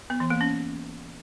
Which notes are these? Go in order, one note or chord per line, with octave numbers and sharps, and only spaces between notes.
B3
E3
A#3
C#4